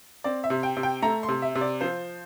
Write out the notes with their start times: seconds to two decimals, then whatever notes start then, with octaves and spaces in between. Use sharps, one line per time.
0.24 C4 D5
0.44 E5
0.50 C3
0.63 G5
0.77 C3
0.83 G5
1.02 A3 A#5
1.23 C6
1.28 C3
1.42 E5
1.55 C3
1.61 D5
1.81 F3 C5